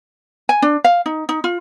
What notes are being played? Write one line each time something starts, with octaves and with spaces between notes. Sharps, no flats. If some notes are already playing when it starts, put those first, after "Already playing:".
G#5
D4
F5
D#4
D#4
F4